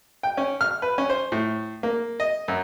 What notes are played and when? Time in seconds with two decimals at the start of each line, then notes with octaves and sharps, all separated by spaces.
0.23 G5
0.37 C#4
0.61 F6
0.82 B4
0.98 C#4
1.10 C5
1.32 A2
1.83 A#3
2.20 D#5
2.48 F#2